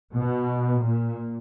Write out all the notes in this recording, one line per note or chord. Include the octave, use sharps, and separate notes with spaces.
B2
A#2